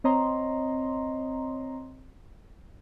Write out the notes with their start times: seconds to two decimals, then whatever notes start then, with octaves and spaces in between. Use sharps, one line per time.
0.04 C4 C#5 D#5 A#5 C6